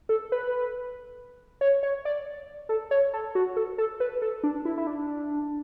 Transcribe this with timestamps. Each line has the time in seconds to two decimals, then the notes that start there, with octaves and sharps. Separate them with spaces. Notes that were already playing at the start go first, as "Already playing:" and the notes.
0.09 A4
0.32 B4
1.61 C#5
1.83 C#5
2.05 D5
2.69 A4
2.91 C#5
3.14 A4
3.35 F#4
3.57 A4
3.78 A4
4.00 B4
4.22 A4
4.43 D4
4.65 E4
4.78 E4
4.87 D4